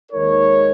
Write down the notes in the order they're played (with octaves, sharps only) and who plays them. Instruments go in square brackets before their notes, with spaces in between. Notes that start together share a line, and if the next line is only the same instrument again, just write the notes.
[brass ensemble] D#2 D#3 G#3 D#4 A#4 C#5